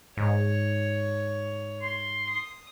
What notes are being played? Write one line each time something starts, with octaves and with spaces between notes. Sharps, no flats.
G#2 C#5
C6
D#6